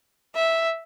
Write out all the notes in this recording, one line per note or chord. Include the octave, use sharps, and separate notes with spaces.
E5